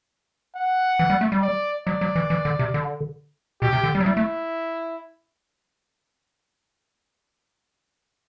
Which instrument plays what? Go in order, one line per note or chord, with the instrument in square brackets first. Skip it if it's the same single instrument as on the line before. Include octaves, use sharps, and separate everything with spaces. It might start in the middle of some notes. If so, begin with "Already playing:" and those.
[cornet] F#5
[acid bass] E3
G3
A3
G3
[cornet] D5
[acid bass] F#3 [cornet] D5
[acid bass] F#3
E3
E3
D3
C3
D3
[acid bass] B2 [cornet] G4
[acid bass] C3
D3
G3
F#3
[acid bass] G3 [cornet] E4
[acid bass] A3